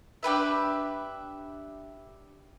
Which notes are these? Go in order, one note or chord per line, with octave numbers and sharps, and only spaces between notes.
D4 G4 B4 E5